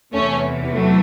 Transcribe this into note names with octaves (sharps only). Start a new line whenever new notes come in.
E2 C3 E3 A3 C#4
F#3 A3